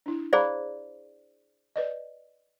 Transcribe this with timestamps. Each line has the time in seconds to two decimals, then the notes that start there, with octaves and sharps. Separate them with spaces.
0.06 D4 E4
0.33 G#4 C5 D5 F5 A#5 B5
1.76 B4 D5 D#5